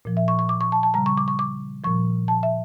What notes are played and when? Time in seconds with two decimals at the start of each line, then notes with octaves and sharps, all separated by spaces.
0.05 A#2 F3
0.17 E5
0.28 C#6
0.39 C#6
0.49 D6
0.61 C#6
0.72 A5
0.83 A5
0.94 C#3 G3 A#5
1.06 C#6
1.17 D6
1.28 C#6
1.39 D6
1.84 A#2 F3 C#6
2.28 A5
2.43 E5